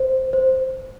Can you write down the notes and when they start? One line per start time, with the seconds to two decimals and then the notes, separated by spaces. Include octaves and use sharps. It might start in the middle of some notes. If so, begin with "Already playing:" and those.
Already playing: C5
0.33 C5